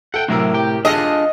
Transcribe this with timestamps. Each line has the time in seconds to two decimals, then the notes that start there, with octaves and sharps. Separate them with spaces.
0.14 A4 F#5 G5
0.28 A2 C3 F#3 E4 A#4
0.54 G4 G5
0.85 D4 F4 G#4 A4 D#5 E6